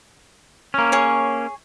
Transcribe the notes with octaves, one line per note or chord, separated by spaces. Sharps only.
A#3 C#4
G#4 C#5